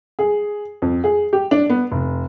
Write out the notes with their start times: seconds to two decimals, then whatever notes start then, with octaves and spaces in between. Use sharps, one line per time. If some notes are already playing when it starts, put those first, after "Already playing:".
0.19 G#4
0.82 F2
1.04 G#4
1.33 G4
1.51 D4
1.70 B3
1.91 F1